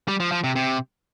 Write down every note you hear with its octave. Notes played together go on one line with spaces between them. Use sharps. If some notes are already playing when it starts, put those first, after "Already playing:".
G3
F3
F3
C3
C3